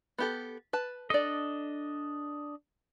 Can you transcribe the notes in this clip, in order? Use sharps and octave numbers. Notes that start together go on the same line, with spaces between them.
B3 G4 A4
B4 A5
D4 A4 D5 D#5